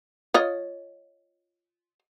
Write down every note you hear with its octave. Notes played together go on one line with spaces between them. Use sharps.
F4 C#5 D#5